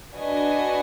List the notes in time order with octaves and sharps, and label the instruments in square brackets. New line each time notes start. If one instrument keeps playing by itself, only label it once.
[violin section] D4 F#4 B4 D#5 G#5